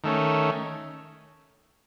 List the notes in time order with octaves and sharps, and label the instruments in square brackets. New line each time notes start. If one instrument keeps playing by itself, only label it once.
[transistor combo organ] D#3 A3 C#4